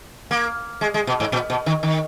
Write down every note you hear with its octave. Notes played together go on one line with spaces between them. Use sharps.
A#3
G#3
G#3
B2
G#2
A#2
B2
D#3
D#3